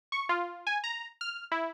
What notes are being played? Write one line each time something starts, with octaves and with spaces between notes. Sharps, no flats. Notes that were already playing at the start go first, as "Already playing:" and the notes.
C#6
F4
G#5
A#5
F6
E4